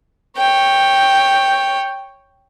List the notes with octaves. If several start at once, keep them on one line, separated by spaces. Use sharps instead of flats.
C#5 G5